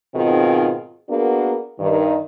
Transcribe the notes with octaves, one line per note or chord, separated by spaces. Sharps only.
G#2 B2 D#3 C4 F4 G#4
A#3 B3 D4 F#4 G#4 A#4
G2 D#3